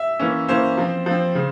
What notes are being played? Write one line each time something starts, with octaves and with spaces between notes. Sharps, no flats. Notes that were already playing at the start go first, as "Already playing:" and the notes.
Already playing: E5
E3 A#3 C#4
E3 A#3 C#4 C5
F3 C4
F3 C4
C#3